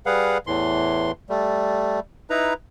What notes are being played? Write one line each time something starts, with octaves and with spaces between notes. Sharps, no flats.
G3 G#4 B4 F5 F#5
E2 A2 E3 C6
G3 A3
D#4 E4 B4 A#5